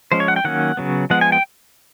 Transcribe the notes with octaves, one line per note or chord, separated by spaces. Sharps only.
F3 G#3 C#4 C5
C#5
F#5
G5
D#3 F#3 A#3 C#4 F#5
C#3 F#3 B3
F3 G#3 B3 F#5
G#5
G5